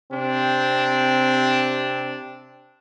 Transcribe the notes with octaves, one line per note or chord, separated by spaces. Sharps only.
C3 C4 D4